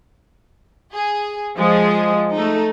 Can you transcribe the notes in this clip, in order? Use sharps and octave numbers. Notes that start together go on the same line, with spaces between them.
G#4
F3 G#3 G#4
A3 D#4